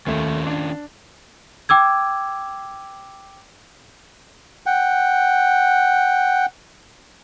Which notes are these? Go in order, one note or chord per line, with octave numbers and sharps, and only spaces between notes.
D#2 D#3 A3 C#4 F4
D4
G5 D6 E6 G#6
F#5 G5